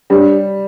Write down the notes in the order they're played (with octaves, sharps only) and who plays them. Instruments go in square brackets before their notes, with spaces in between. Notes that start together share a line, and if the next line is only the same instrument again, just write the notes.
[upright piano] G3 [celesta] D4 G4 C#5